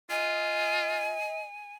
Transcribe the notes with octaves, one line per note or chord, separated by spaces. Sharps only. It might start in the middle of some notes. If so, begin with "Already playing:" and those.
F4 D#5 G#5